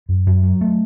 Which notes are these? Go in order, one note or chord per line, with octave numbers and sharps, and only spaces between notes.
F#2
F#2
F#3
A3